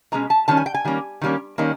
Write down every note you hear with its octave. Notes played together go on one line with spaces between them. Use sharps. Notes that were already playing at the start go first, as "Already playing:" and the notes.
B2 G#3 C#4 A#5
A5
D#3 G3 C#4 A5
G#5
G5
G#5
D#3 G3 A#3 C#4
D#3 G3 A#3 C#4
D#3 G3 A#3 C#4